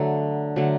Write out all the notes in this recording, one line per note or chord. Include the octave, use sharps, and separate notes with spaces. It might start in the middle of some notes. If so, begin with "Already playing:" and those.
Already playing: D3 F#3 A3
D3 F#3 A3